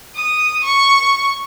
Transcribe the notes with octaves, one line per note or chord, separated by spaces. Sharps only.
D#6
C#6